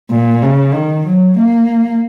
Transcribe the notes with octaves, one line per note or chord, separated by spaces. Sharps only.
A#2
C#3
D#3
F#3
A#3